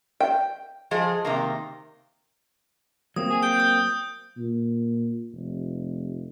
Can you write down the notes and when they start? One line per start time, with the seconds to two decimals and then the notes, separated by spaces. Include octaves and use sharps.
0.20 G5
0.91 F3 G#3 G#4
1.25 C3 D#3 A#3
3.16 F#3 A#3 C4 D#6
3.30 G#4
3.43 G5 G6
3.60 D#6
4.37 A#2
5.33 F1